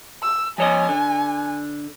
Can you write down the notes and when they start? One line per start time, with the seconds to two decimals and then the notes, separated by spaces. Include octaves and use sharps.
0.22 E6
0.58 F3 C#5 D#5 G#5
0.89 D3